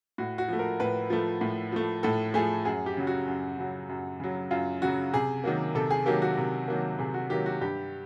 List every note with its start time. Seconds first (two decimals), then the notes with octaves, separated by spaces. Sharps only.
0.18 A2 F#4
0.38 F#4
0.48 F3 A3
0.59 A#4
0.80 A2 B4
1.10 F3 A3
1.41 A2
1.72 F3 A3
2.03 A2 A4
2.34 F3 A3 G#4
2.65 F#2 G#4
2.86 G4
2.97 C#3 F#3
3.07 F#4
3.28 F#2
3.58 C#3 F#3
3.89 F#2
4.20 C#3 F#3
4.51 F#2 F4
4.82 C#3 F#3 F#4
5.13 C3 G#4
5.44 D#3 F#3 A#3
5.75 C3 A4
5.91 G#4
6.06 D#3 F#3 A#3 G4
6.22 F#4
6.37 C3
6.68 D#3 F#3 A#3
6.99 C3 G#4
7.14 F#4
7.30 D#3 F#3 A#3 G4
7.46 F#4
7.60 G2 G4